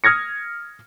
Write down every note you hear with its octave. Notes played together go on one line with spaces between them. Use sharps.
D#6 F6 G#6 A#6 C#7